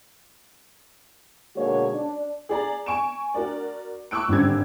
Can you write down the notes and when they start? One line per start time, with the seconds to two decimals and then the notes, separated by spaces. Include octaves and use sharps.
1.56 B2 D3 G#3 A#3 F#4 C#5
1.94 D4
2.49 G#4 D5 A#5
2.86 G#5 C#6 D7 E7
3.34 D4 F#4 A#4 D5
4.11 C#6 D6 E6 F#6 D7
4.28 G#1 G2 D3 G3 C#4 G#6